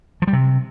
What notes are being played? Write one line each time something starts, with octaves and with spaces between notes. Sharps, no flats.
F3
G3
C3